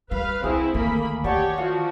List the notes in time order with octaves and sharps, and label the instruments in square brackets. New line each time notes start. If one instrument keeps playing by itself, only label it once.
[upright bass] G3 [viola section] B4 F5
[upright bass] C2 [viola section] C4 E4 [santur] G#4 D#6
[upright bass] D2 D#3 [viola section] A3 A#3 B5
[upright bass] D#3 [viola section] G4 C#5 [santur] D5 F#5 A5
[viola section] F3 F#4 [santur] F5